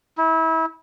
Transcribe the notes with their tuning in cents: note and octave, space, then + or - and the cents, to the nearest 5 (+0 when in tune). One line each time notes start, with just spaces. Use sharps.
E4 -30